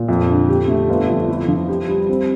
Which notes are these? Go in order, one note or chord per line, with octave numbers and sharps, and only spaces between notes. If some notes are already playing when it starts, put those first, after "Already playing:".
Already playing: A#2
F2
D3
G4
A3
G1
F2
E4
F3
G4
G3
C4